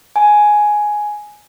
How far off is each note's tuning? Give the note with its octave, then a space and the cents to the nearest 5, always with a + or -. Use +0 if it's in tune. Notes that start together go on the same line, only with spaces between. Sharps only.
G#5 +10